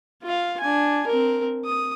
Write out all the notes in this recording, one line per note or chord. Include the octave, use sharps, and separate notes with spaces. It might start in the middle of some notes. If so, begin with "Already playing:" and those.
F4 F5
D4 G#5
C4 A#4
D#6